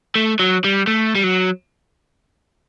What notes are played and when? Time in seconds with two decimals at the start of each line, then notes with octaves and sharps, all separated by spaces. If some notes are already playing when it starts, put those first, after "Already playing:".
0.15 A3
0.39 F#3
0.64 G3
0.87 A3
1.15 G3
1.24 F#3